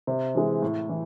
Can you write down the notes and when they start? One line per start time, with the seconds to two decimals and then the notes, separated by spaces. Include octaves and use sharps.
0.07 C3
0.35 E3 G#3
0.62 A2
0.89 E3